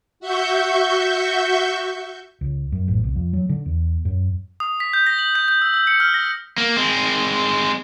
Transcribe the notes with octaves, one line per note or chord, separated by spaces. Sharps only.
F#4 E5 C#6 G6
C#2
F#2
A1
C2
F2
F#3
D3
E2
F#2
D#6
B6
G6
A#6
F#7
G6
G6
E6
E6
C#7
F6
A#6
A#3
G#3 C4